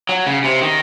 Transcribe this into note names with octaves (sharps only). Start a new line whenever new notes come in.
F#3
C#3
C3
D#3